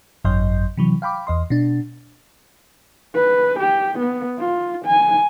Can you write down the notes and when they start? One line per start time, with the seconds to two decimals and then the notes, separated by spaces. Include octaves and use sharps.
0.24 G#1 F#2 F#3 D#5 C6 G6
0.77 C3 E3 F#3
1.02 F5 G5 B5 D6
1.27 E2 D#5 C6
1.50 B2 D4
3.14 B4
3.59 G4
3.99 B3
4.38 F4
4.85 G#5